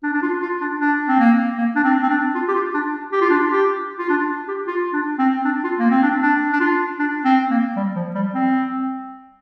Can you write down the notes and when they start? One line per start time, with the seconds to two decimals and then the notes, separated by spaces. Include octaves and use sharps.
0.03 D4
0.13 D4
0.22 F4
0.42 F4
0.61 D4
0.80 D4
1.08 C4
1.19 A#3
1.58 A#3
1.75 D4
1.84 C4
2.03 C4
2.09 D4
2.35 F4
2.48 G4
2.55 F4
2.74 D4
3.13 G4
3.21 F4
3.30 D4
3.39 F4
3.51 G4
3.99 F4
4.09 D4
4.48 G4
4.67 F4
4.93 D4
5.19 C4
5.45 D4
5.64 F4
5.79 A#3
5.91 C4
6.02 D4
6.22 D4
6.53 D4
6.60 F4
6.99 D4
7.25 C4
7.51 A#3
7.76 G3
7.96 F3
8.15 G3
8.34 C4